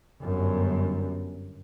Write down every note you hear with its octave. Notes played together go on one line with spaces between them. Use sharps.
G1 F#2